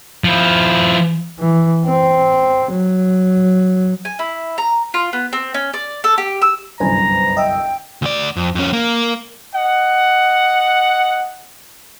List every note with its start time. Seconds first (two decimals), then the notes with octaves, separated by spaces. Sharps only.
0.24 F3 E4
1.39 E3
1.86 C4
2.72 F#3
4.05 G#5
4.19 E4
4.58 A#5
4.94 F4
5.13 B3
5.33 C4
5.54 C#4
5.74 D5
6.04 A4
6.18 G4
6.42 E6
6.80 G1 C2 F#2 B4 C5 G#5 A#5
7.37 D#5 E5 G5 E6
8.02 D2 D5
8.36 F2
8.55 F2 C#4
8.73 A#3
9.53 D#5 F#5